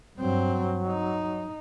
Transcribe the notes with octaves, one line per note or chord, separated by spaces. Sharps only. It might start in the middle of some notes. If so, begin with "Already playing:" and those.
G2 F#3 C4
D#4